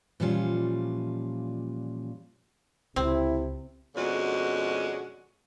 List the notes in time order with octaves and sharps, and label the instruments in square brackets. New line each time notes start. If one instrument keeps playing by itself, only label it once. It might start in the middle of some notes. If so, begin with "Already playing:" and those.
[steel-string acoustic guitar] A#2 E3 F3 G3 C#4 F4
[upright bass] C#2 [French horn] C3 [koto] C4 [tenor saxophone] E4
[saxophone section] F2 B2 D3 G#3 C#4 F#4